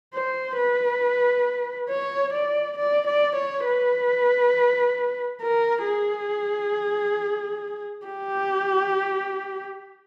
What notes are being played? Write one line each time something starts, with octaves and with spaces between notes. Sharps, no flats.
C5
B4
C#5
D5
D5
D5
C#5
B4
A#4
G#4
G4